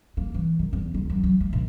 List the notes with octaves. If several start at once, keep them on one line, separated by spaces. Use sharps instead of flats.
A#3
E3
D#3
E2
D#2
F#2
F#3
A3
A#1